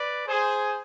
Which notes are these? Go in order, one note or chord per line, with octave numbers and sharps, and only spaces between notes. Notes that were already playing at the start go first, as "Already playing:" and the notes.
Already playing: B4 D5
G#4 C5